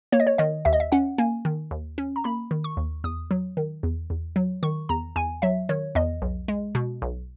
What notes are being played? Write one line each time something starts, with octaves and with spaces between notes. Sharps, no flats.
A#3 C#5
D#5
C#5
D#3 D#5
D#2 E5
D#5
E5
C#4 F#5
A#3 G#5
D#3
D#2
C#4
A#5
A#3 B5
D#3
C#6
D#2
E2 D#6
F#3
D#3
E2
E2
F#3
D#3 C#6
E2 A#5
E2 G#5
F#3 E5
D#3 C#5
E2 D#5
B1
G#3
B2
B1